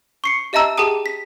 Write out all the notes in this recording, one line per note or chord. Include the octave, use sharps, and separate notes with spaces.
C#6 C7 C#7
G4 D#5 E5 A5 A#5 E6
G4 G#4 G5 A5 D#6 D#7
B6